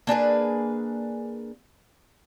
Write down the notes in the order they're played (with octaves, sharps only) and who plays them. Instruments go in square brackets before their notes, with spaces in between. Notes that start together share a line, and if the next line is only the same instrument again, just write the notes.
[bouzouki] A#3 D4 G#4 B4